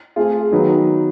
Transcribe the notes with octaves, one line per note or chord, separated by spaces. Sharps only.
A3 C4 F4 G#4
D#3 F#3 B3 D#4